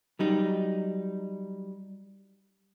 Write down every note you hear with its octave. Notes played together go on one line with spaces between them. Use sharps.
F#3 G3 D#4